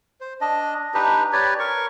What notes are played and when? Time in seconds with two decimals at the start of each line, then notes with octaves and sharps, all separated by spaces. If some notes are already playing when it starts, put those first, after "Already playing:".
0.21 C5
0.41 D4 D#5
0.94 D4 D#4 G4 B4
1.33 G4 B4 C#5 D5
1.59 A#4 C#6